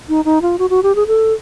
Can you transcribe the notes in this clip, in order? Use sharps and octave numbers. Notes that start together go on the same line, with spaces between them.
D#4
D#4
F4
F#4
F#4
G4
G#4
A4